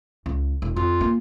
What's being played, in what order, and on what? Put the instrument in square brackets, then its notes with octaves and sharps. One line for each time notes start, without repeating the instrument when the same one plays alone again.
[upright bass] C#2
E1
[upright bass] F2 [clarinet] F4
[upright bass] A#3